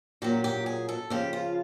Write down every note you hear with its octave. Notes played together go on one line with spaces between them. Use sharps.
A#2 F#3 G4
G4
G#4
A4
C#3 F3 G4
F4